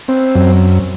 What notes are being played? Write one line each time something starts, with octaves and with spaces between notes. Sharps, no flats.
C4
F#2